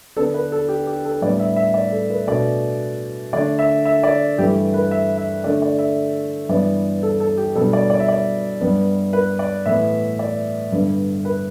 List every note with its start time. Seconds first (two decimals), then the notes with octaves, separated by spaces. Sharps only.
0.16 D3 B3 D4 A4
0.34 B4
0.52 A4
0.69 G4
0.87 G4
1.05 A4
1.22 A2 G3 B3 D4 D5
1.40 E5
1.56 E5
1.74 D5
1.92 A4
2.10 B4
2.27 B2 A3 D4 D5
3.33 D3 A3 D4 D5
3.59 E5
3.85 E5
4.04 D5
4.38 G2 E3 A3 G4
4.74 B4
4.91 E5
5.18 E5
5.44 D3 A3 D4 D5
5.62 D5
5.79 E5
6.49 G2 E3 B3 D5
7.03 A4
7.20 A4
7.37 G4
7.55 B2 G3 B3 D4 A4
7.73 D5
7.90 D5
8.00 E5
8.08 D5
8.61 G2 G3 B3 D4
9.13 B4
9.39 D5
9.66 A2 E3 B3 E5
10.19 D5
10.72 G2 D3 B3
11.25 B4